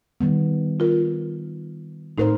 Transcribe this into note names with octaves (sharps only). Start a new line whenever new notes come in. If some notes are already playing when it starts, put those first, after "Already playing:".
D#3 G3 B3
F4 A#4
A2 A3 D#4 A#4 C5